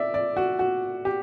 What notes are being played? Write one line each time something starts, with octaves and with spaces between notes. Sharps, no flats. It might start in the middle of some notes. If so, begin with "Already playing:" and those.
Already playing: D5 E5
D5
F#4
F#4
G4